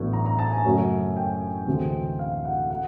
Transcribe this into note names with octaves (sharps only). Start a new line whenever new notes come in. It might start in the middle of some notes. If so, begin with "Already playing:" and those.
Already playing: A1 A2 F#3 B3 D4
A#5
A#5
A5
G#5
F#2 C#3 F#3 A3 C#4
G5
D2 C3 E3 G#3 C4
F5
F#5
F#5